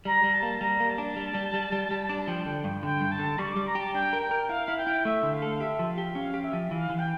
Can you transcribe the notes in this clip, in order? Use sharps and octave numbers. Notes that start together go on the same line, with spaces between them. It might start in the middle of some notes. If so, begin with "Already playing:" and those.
G3 A#5
G3
A5
A#3
G3 A#5
A#3
A5
D4
G3
G3
G3
G3
G3
D4
F3 G5
D3
G2
D3 G5
G2
A5
D3
G3 C#6
G3 D6
A#5
G4 A5
D4 G5
A#4
G5
A#4
E4 F5
E4
G5
E4
A3 E5
D3
F5
A4
G4 E5
F3
F5
G4
C#4 F5
G4
E5
F3
E3 F5
E3
G5